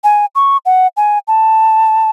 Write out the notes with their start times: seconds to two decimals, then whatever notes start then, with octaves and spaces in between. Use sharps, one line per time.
0.04 G#5
0.35 C#6
0.66 F#5
0.97 G#5
1.28 A5